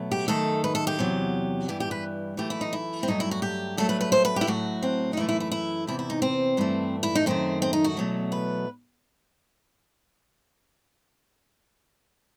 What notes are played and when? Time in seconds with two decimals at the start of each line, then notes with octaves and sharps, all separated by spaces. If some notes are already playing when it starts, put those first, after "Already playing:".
Already playing: B2 F#3 A3
0.12 G4
0.28 F#2 D#3 A3 A4
0.64 B4
0.75 A4
0.87 G4
0.99 E2 C3 F#3
1.68 G2 E3 G3 G4
1.80 G4
1.91 B4
2.37 F#2 E3 A3 G4
2.50 E4
2.61 D#4
2.73 E4
3.03 C4
3.08 G2 F#3 A3 D#4
3.20 E4
3.31 F#4
3.42 G4
3.77 G2 F#3 A3 A4
3.89 B4
4.01 B4
4.12 C5
4.25 B4
4.36 E4 G4
4.47 A2 F#3 A3 F#4
4.83 C4
5.13 D#4
5.17 F#2 E3 A3 E4
5.29 E4
5.40 E4
5.52 E4
5.87 E2 C3 E3 E4
5.99 E4
6.10 D#4
6.22 C4
6.57 G2 E3 A3
7.03 E4
7.15 D#4
7.26 F#2 D#3 A3 C4
7.62 C4
7.73 D#4
7.84 F#4
7.97 E2 B2 F#3 A3
8.32 B4